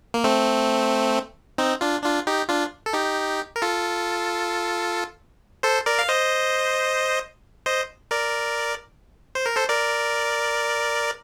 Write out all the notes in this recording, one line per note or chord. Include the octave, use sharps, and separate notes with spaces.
A#3
A3 C4
C4 D#4
D4 F4
D4 F4
D#4 G4
D4 F4
A4
D#4 G4
A#4
F4 A4
A4 C5
A#4 D5
F5
C5 D#5
C5 D#5
A#4 D5
C5
A#4
A4 C5
A#4 D5